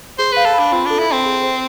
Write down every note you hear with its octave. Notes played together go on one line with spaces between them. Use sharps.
G#4 C5
B4 F5
A4
B5
D4
C4 F4
D4 A4
E4
C4 A4
G#4
C5